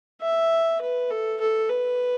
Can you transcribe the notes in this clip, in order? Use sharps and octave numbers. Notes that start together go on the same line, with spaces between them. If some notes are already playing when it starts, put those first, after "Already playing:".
E5
B4
A4
A4
B4